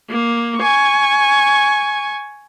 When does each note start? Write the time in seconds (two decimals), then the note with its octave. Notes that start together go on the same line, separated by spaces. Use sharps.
0.10 A#3
0.58 G#5 C#6